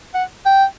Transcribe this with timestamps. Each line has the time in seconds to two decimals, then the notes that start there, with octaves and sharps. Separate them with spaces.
0.14 F#5
0.46 G5